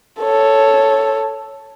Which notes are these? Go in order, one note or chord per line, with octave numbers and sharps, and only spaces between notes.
A4 C#5